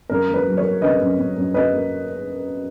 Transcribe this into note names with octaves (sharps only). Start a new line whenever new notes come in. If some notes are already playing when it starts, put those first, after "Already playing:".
F#2 A#4
A#3
B4
F#3
A#4 C#5
A#3
C#3 B4 D#5
F#2
F#2
F#2
F#2 B4 D#5
A#3